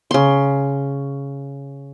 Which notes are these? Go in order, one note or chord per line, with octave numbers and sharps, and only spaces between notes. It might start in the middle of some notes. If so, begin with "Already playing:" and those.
C#3 C6